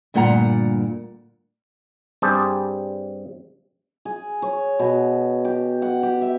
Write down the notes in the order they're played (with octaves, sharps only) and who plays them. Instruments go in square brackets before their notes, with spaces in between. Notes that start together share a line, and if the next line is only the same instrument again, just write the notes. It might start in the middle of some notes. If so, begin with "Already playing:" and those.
[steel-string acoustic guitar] D2 G2 A#2 A#3 F#5 A#5
[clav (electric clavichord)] G2 G3 C4 G4 G#4 A5
[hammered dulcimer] G#4
C#5
B2
G4
F#5
G4
E5